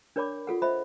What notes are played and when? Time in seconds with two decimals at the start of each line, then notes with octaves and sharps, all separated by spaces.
0.16 D4 A#4 C#5 D5 B5 D6
0.47 F4 A4 F#5
0.62 C5 D#5 E5 B5